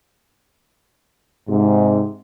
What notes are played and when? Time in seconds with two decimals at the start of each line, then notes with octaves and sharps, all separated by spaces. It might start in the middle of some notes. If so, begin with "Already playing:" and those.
1.48 G#2 C3